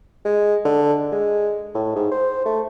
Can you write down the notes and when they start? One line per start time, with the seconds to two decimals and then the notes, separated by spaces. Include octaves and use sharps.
0.25 G#3
0.65 D3
1.12 G#3
1.75 A2
1.95 G#2
2.11 C5
2.45 A3